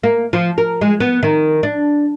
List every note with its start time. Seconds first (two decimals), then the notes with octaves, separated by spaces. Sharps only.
0.03 A#3
0.33 F3
0.58 A#4
0.81 G#3
1.00 B3
1.23 D#3
1.63 D4